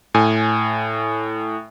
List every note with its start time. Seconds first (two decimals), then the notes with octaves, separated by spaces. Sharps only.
0.14 A2 G#5